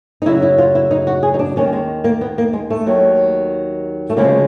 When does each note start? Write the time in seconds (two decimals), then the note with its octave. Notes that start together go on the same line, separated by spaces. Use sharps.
0.22 D#4
0.25 F#2 C#3 F#3 E4
0.42 E4
0.58 F4
0.75 E4
0.91 D#4
1.07 F#4
1.23 G#4
1.34 D#4
1.39 D4
1.56 D#2 D#3 G3 C#4
1.73 G#3
2.04 A#3
2.21 B3
2.38 A#3
2.53 G#3
2.70 A3
2.86 D#2 D#3 F#3
4.10 A3
4.17 D2 C#3 F3 G#3 A#3